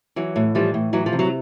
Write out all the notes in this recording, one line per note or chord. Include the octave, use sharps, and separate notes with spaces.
E3 F#3
A2
E3 F3 G3
A2
E3 F#3
F3
C3
F#3